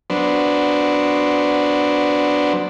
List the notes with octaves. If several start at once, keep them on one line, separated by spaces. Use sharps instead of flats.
F#3 B3 D4 C5